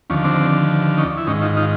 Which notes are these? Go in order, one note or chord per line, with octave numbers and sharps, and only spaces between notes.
D#2 D3 F3 C#4
C4 D4
C#4 D#4
E4
G#2 D#3 C#4 D#4
D#4 F4
D#4 F4